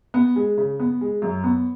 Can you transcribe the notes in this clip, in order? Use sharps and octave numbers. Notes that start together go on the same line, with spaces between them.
B3
G#3
C#3
B3
G#3
F#2
B3